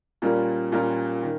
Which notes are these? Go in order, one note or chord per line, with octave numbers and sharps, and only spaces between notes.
A#2 G3 C#4 F4 A#4
A#2 G3 C#4 F4 A#4
D#3